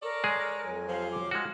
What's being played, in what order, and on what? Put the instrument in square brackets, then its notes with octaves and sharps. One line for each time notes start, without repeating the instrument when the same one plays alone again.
[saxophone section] A4 C#5 D5 [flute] A#4
[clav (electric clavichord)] G#3 G#4
[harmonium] F2 F#3 G#5
[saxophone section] C3 F3 [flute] F5
[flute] D6
[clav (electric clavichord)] G#3 F#4 [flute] F6